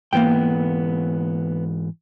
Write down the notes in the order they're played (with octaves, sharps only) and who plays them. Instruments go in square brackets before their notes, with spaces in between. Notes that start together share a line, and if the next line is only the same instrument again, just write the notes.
[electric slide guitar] G#2 E3 [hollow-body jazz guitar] A#3 B3 G5